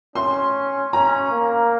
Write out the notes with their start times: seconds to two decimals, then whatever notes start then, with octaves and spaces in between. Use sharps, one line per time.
0.15 C#4 C6
0.93 C#4 A#5
1.31 A#3